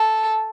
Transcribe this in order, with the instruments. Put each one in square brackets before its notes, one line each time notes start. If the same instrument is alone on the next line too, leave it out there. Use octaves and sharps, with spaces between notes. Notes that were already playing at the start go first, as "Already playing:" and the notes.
Already playing: [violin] A4